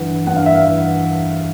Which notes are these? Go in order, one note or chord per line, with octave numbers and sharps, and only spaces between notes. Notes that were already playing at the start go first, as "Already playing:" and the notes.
Already playing: G2 E3 F#5
G2 F#5
F5
E5
F5
E3